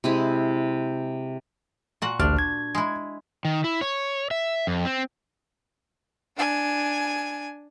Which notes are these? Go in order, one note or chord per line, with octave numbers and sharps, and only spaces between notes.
C3 G#3 E4
A#2 F#4 F#5
A1 D2 D4 F6
G#6
G#3 E4
D#3
E4
C#5
E5
F2
C4
D4 G#5